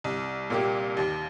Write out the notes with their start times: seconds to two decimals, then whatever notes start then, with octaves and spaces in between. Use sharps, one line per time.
0.04 C2
0.50 A#2 A#3 G4
0.97 D#2